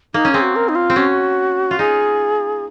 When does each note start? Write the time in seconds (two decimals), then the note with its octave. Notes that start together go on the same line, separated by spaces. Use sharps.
0.14 A#3 D#4
0.25 C#4
0.32 C4 G#4
0.41 F#4
0.56 A#4
0.69 D#4
0.75 F4
0.90 C4
0.96 C#4 F#4
1.71 F4
1.79 D#4 G#4